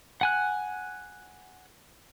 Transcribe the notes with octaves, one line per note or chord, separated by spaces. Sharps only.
F#5 G#5 F#6